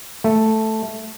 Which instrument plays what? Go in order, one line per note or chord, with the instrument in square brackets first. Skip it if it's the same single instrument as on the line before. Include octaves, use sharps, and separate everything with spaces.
[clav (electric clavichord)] A3